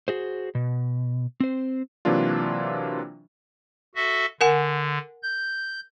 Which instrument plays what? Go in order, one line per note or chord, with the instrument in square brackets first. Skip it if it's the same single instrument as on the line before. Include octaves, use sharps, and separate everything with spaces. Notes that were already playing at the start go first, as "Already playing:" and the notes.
[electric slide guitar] F#4 G#4 C5
B2
C4 C5
[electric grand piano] C3 E3 F#3 A#3 D4 F4
[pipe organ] F#4 A4 E5
[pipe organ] D3 [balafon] A#4 F#5 G#5
[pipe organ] G6